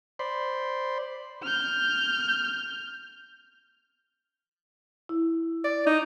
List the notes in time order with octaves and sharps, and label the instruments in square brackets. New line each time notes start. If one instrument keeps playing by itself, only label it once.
[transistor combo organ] C5 D5 B5 C6
[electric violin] F6 G6
[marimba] E4
[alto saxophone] D5
D#4